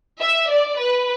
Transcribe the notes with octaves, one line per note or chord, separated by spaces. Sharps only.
E5
D5
B4